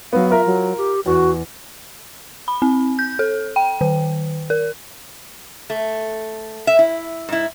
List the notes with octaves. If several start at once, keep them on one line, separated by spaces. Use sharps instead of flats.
F#3 B3 F5
F4 A#4 E5 A#5
F#3
G4
E2 F#4
B5
C4
G6
A4
G5
D#3
A#4
A3
E5
E4
G#2 E4